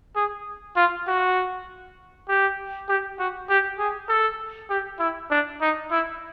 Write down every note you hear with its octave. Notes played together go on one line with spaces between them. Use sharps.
G#4
F4
F#4
G4
G4
F#4
G4
G#4
A4
G4
E4
D4
D#4
E4